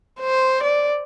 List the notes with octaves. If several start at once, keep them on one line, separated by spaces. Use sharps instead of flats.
C5
D5